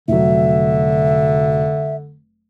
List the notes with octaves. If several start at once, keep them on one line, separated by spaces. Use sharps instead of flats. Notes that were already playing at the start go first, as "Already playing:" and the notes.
F1 D3 F#3 E5